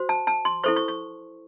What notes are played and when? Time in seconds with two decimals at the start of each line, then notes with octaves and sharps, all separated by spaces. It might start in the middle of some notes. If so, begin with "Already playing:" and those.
Already playing: F#4 C5
0.09 A5
0.27 A5
0.45 C6
0.64 E4 A4 C5 C#6
0.76 C#6
0.88 C#6